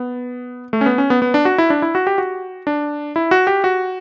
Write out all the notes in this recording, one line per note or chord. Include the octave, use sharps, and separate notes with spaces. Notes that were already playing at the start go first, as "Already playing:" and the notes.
Already playing: B3
A3
C#4
B3
C#4
B3
B3
D4
F#4
E4
D4
E4
F#4
G4
F#4
D4
E4
F#4
G4
F#4